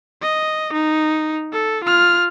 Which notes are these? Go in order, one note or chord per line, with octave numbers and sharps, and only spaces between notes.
D#5
D#4
A4
F4 F6